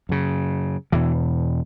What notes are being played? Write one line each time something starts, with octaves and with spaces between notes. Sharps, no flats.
F#2 C#3
E2 B2 E3